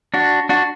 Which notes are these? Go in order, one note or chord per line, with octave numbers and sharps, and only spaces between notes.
D4 F#4
D4 F#4